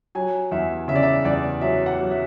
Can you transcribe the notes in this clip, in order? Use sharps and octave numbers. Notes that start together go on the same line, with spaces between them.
F#3 G#5
E2 E5
C#3 E5
D5
E5
E2 D5
F#3 E5
F#5
F#3
E5